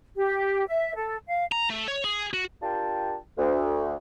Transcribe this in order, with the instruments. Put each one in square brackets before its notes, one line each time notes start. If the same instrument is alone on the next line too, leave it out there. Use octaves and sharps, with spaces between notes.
[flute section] G4
E5
A4
F5
[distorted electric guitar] A#5
A3
C#5
G#4
F#4
[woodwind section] D4 F4 G4 A#4 G5 A5
D2